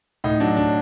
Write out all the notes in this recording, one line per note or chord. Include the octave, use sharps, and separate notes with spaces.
A2 D#4
F#3 D4
D4